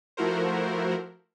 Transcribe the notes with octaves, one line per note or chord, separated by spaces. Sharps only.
F3 A3 E4 F#4 A#4 C5